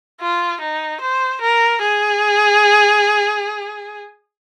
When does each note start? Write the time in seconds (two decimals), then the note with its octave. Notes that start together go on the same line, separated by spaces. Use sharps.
0.21 F4
0.61 D#4
1.01 C5
1.42 A#4
1.81 G#4